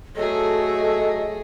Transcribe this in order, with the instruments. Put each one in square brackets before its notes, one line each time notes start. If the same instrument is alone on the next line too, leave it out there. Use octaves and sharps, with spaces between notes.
[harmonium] F#3 [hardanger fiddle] A3 G#4 [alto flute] A4 [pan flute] D#5